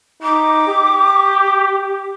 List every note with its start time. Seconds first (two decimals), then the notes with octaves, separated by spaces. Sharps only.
0.23 D#4 D6
0.68 G4